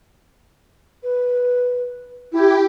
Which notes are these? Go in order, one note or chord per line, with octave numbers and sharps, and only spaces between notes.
B4
E4 G4